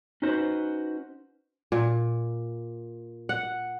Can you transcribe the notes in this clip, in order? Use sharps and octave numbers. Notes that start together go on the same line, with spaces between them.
C#4 D#4 F#4 B4 C5
A#2
F#5